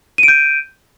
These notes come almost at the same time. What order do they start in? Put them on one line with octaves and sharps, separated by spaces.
D#7 D7 G6